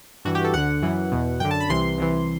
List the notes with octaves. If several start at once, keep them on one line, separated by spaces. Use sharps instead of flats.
G2 E3 F#4
G4
A4
D2 D3 F#5
F#2 E3
E2 B2
F#2 D3 G5
A5
B5
C2 C3 E3 C6
C2 C3 E3